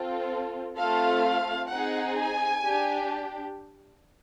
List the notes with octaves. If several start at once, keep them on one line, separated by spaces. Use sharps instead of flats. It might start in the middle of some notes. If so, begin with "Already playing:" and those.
Already playing: C4 F4 A4
A3 C4 F4 A4 F5
C4 D#4 G#4 F#5
G#5
D4 G4